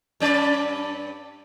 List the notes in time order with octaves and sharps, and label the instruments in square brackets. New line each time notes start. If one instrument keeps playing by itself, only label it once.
[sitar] G2 C#4 D5